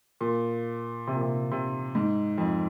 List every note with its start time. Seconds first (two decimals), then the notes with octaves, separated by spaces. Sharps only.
0.21 A#2
1.07 C3
1.15 A#2
1.21 C3
1.51 C3
1.95 G#2
2.38 F2